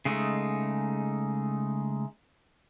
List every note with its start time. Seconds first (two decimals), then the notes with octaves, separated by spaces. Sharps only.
0.05 C#3 G#3 A3 D#4